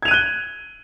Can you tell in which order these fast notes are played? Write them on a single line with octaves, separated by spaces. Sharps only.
G#6 F7 D#7 F#6 G7